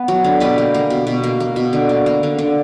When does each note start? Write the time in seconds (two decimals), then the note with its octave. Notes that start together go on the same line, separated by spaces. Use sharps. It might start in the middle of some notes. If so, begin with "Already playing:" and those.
Already playing: B3 B4
0.08 F#3
0.24 D3
0.40 B2 G4 B4
0.58 A#3
0.74 A#3
0.90 B2
1.07 B2
1.24 A#3
1.40 A#3
1.56 B2
1.73 D3
1.89 A#3
2.06 A#3
2.23 D3
2.39 D3